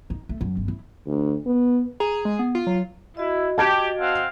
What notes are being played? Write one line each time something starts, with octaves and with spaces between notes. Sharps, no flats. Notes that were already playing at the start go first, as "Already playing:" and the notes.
D#4
A3
F#2
G1
E4
D2
B3
G#4 A#5
G#3
B3
F4
F#3
E4 F#4 D#5
G4 A5 G#6 D7
C4 F5 F#5